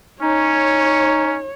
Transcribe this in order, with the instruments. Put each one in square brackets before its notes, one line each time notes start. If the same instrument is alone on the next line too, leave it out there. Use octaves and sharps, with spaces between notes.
[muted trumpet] C#4 [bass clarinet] D#4 [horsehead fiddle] C#5